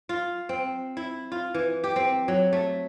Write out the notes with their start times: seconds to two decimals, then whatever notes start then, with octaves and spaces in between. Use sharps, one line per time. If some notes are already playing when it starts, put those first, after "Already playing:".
0.09 F4
0.49 C4
0.97 E4
1.32 F4
1.54 E3
1.84 G4
1.96 C4
2.28 F#3
2.53 A3